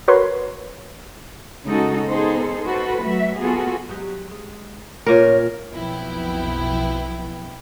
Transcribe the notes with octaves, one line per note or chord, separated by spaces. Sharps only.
F#4 A#4 B4 C#5 C6
C#3 G#3 D#4 F#4 A4
B3 D#4 G#4 A4 C5
F#4 A4 B4 C5
F#3 A3 F#4 E5
B3 F4 F#4 G#4 A4
F#3 G#3 G4
G#3
A#2 C#4 A#4 C#5
B1 F2 B3 E4 G5